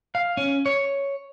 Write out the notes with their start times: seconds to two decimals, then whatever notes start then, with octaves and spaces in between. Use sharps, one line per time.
0.15 F5
0.37 C#4
0.66 C#5